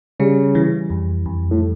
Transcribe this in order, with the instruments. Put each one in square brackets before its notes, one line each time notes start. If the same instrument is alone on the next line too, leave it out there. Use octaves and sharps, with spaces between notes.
[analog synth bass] C#3 [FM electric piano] G3
[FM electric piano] E3
F2
F2
[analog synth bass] A2